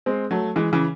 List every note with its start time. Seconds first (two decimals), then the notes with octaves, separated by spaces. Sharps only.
0.06 G#3 C4
0.31 F#3 A3
0.56 E3 G#3
0.73 C#3 E3